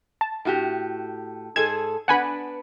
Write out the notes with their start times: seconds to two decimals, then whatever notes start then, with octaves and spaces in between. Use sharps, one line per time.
0.21 A5
0.45 A2 F#4 G4
1.56 G#2 G#4 A4 G#6 E7
2.08 B3 D4 B4 F#5 G#5 B5